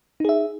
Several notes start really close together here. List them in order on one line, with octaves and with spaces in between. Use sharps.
D#4 G#4 E5